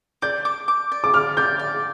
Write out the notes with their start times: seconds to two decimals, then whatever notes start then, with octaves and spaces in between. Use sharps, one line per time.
0.22 D5 G6
0.45 D6
0.68 D6
0.92 D5
1.04 D6
1.13 D5 F6
1.37 D5 G6
1.59 D5